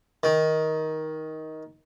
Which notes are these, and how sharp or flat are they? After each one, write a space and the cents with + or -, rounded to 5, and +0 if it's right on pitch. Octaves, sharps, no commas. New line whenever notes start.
D#3 +15